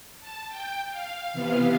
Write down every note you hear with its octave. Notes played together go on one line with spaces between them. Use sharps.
A5
G5
F5
C3 E3 B3